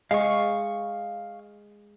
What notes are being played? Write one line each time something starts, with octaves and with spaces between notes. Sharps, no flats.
G#3 F5 C#6